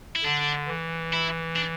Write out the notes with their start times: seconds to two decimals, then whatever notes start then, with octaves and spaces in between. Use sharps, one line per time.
0.16 E4
0.24 D3 D4
0.68 E3
1.13 E4
1.56 D4